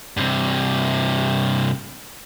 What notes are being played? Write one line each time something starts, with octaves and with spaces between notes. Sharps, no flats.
G2 C3